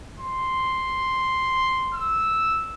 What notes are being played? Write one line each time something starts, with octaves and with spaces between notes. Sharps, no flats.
C6
E6